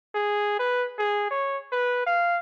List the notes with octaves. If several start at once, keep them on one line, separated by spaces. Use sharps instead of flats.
G#4
B4
G#4
C#5
B4
F5